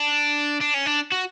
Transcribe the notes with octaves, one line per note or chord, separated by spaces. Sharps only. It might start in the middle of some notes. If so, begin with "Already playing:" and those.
Already playing: D4
D4
C#4
D4
F#4